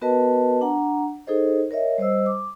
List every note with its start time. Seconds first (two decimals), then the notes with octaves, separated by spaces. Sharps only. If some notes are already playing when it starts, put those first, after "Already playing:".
0.01 B3 F#4 A#4 B4 D#5 A5
0.61 D4 F#5 A#5
1.27 D#4 G#4 A4 C5 D#5
1.71 A#4 C#5 D#5 E5
1.98 G3 C5 D#5 E6
2.26 D6